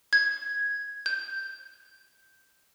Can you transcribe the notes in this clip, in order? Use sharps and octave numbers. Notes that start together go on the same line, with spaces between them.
G#6
G6